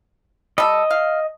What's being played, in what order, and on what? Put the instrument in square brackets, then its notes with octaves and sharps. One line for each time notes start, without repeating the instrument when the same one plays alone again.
[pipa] G3 A4 [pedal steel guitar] D#5
[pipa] F5